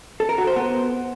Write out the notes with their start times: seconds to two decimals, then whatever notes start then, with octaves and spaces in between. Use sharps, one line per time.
0.20 A4
0.29 A#4
0.38 F#4
0.47 C5
0.56 B3